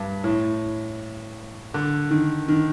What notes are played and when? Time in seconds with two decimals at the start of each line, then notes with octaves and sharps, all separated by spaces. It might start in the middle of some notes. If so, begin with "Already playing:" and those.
Already playing: G2
0.24 A2
1.74 D3
2.11 D#3
2.48 D#3